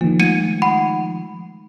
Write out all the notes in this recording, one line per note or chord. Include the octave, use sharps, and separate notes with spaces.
D#3 F3 A#3
G#3 A3 G#6 C#7 D#7
F#5 B5